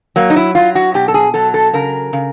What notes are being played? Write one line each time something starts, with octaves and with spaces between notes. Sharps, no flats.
F#3 A#3
D#4
E4
F#3 F4
F#4
B2 G4
A4
G#4
F#3 A4
A4
C#3 A#4
C#3